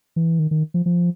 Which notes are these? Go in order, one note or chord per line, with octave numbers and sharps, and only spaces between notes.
E3
D#3
D#3
F3
F3